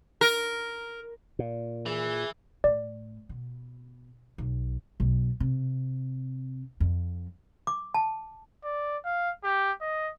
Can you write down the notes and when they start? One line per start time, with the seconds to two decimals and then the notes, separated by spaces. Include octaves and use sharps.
0.21 A#4
1.39 A#2
1.86 E3 G#4
2.64 A2 D5
3.29 B2
4.38 B1
5.00 B1
5.40 C3
6.80 F2
7.67 D6
7.94 A5
8.64 D5
9.05 F5
9.44 G4
9.81 D#5